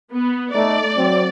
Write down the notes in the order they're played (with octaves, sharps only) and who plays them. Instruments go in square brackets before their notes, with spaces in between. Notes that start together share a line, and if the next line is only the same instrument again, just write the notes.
[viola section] B3
[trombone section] A3 D#4 [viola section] D5
[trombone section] F#3 C4